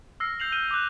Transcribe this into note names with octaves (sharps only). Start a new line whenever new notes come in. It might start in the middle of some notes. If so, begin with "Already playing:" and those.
E6 F6 A#6 C7
G6 C7 F7 F#7
F6 G6 D#7 G7
D6 F#6